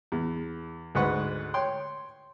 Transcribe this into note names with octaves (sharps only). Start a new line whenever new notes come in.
E2
D2 G#2 B4 F#5 C#6
C#5 G5 C6